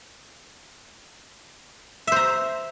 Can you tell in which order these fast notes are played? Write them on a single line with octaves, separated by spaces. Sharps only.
E5 C5 A#5